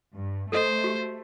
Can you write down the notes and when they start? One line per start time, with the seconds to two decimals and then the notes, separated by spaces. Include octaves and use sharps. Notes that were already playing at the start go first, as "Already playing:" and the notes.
0.16 G2
0.52 A3 A4 C5 D#5
0.84 F#4 G4